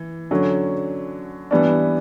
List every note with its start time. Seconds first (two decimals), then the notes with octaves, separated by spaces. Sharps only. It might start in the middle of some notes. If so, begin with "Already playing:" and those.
Already playing: E3
0.31 D3 F#3 C#4
1.51 E3 G3 B3 D4